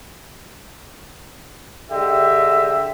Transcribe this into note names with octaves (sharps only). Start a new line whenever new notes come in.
D3 G#3 G4 E5